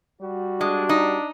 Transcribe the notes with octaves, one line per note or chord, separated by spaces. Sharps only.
G3 F#4
G#3 D4
D#4